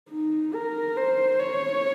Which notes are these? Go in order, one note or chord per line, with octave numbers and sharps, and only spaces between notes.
D#4
A#4
C5
C#5